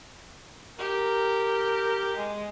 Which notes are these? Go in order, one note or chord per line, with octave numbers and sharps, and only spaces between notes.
G4 A#4
G#3